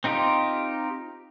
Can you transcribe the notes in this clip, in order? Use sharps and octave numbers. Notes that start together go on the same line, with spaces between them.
C4 D#4 F4 G4